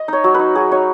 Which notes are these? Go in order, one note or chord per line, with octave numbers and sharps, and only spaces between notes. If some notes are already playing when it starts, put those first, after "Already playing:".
Already playing: D#5
D#4 C#5
F#3
D#4 B4
F#3 G#4
D#4 C#5